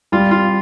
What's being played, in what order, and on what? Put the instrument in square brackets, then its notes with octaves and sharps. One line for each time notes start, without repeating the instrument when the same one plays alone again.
[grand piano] G3 [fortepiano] F4
[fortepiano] F4